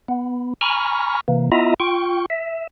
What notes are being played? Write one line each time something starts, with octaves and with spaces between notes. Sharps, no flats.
B3
G#5 A#5 B5 C#6 F6
C3 E3 A#3
B3 E4 F4 D#5 E5 A#5
F4 G5 C#6
E5